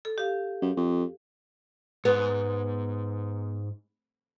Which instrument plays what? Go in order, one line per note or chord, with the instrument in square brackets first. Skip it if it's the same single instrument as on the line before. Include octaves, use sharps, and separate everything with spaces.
[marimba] A4
G4 F5
[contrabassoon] F#2
F2
[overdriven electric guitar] G#2 [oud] B3